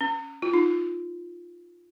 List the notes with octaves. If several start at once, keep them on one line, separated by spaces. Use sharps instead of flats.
C#4
F4
D#4